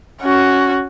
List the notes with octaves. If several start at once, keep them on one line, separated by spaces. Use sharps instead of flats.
C#4 F#4